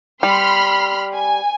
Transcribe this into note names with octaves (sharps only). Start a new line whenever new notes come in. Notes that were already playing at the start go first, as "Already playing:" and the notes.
G3 B5 C6 F6
G#5